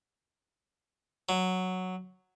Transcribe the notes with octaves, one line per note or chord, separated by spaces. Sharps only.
F#3